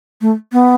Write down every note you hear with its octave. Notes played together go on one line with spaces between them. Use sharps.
A3
B3